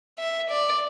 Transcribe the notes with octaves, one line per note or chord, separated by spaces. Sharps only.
E5
D5